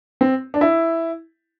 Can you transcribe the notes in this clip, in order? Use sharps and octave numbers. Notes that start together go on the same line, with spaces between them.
C4
D4
E4